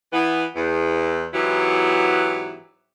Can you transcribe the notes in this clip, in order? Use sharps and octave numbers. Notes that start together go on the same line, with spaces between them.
E3 B3
E2
G#2 E3 F#3 B3 E4 G4